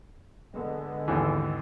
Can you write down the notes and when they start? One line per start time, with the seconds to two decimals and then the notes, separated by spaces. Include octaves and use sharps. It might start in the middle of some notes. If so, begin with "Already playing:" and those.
0.53 D3 G#3 B3
1.08 G#1 D#2 E3